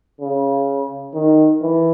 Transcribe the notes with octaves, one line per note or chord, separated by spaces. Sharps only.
C#3
D#3
E3